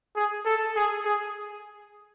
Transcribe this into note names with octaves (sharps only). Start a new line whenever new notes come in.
G#4
A4
G#4
G#4